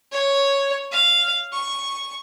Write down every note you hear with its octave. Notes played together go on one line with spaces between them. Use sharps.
C#5
F5
C#6